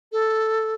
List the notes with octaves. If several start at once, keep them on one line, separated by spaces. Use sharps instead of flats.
A4